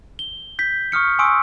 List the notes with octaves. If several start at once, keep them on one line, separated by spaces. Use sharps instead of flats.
G7
G6 B6
C#6 D#6 F6 C#7
G#5 C6 C#6 D#6 E6 D7